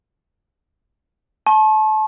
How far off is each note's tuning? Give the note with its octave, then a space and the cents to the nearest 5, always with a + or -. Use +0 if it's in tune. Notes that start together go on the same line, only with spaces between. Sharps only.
A5 -30 C#6 -45